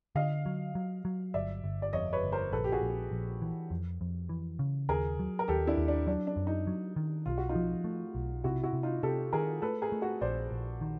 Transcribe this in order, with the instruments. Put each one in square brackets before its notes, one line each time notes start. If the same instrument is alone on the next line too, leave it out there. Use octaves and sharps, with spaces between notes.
[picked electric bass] D3 [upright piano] D#5 F5
[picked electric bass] F#3
F#3
F#3
[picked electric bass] G1 [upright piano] D5 E5
[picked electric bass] G1
[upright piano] D5
[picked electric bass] F2 [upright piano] C#5 D#5
[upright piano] B4 C#5
[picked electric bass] G1
[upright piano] A#4 C5
[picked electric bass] A#1 [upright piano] A4 B4
[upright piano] G4
F#4 G#4
[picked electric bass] A#1
A#1
E3
F2
F2
E3
C#3
[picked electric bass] D#2 [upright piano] G#4 A#4
[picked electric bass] F#3
[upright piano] A#4
[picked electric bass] D#2 [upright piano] G4 A4
[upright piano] D4 E4
[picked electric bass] D#2
[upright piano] D4
[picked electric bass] F#3 [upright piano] D4
[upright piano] D4
[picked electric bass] F#2
[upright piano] D#4
[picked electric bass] F#3
D#3
[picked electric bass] B1 [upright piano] F4
[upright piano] F#4
D#4 F4
[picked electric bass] F3
A3
B1
[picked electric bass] C3 [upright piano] E4 F#4
[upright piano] E4 F#4
[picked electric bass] C3
[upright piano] D#4 F4
[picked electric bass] C3 [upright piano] G4 A4
[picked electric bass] D#3 [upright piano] G#4 A#4
[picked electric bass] A3 [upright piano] A4 B4
[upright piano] G#4 A#4
[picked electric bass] A3
[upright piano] F#4 G#4
[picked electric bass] A#1 [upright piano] C5 D5
[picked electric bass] A#1
D#3